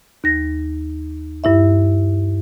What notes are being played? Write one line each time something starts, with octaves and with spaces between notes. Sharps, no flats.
D#2 A#6
G2 E4 E5